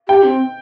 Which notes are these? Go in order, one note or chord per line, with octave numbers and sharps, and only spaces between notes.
G4 G5
C4